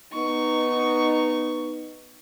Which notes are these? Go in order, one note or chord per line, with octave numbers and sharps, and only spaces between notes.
B3 D#4 C#6